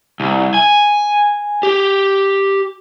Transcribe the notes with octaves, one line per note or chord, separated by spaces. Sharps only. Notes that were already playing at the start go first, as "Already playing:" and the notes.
C2
G#5
G4